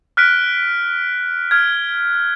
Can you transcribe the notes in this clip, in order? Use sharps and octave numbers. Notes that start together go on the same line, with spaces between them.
F6 F#6 B6 D7
F6 G#6